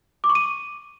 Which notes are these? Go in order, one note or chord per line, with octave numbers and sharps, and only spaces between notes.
D6
C#6
D#7